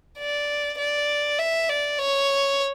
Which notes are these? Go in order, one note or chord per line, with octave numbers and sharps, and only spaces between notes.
D5
D5
E5
D5
C#5